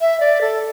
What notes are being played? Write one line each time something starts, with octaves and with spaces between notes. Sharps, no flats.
E5
D5
A4